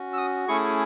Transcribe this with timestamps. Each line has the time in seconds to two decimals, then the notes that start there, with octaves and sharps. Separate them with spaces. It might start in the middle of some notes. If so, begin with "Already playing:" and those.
Already playing: C#4 F#4
0.13 E6
0.17 D#6
0.48 A3 C#4 E4 G#4 C#6